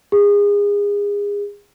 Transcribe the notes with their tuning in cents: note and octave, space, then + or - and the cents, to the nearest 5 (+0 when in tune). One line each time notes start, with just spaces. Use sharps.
G#4 -30